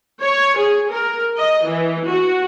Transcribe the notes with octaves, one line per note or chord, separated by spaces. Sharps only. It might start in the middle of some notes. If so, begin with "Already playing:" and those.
C#5
G#4
A#4
D#5
E3
F#4